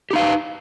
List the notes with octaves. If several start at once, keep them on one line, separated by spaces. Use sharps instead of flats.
D#4 G4 B4 F5